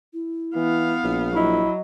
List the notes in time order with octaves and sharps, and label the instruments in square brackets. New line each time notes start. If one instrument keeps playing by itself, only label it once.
[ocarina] E4
[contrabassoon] E3 [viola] B3 F5
[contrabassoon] A#1
[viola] F#3 [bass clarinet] E4 [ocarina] D#5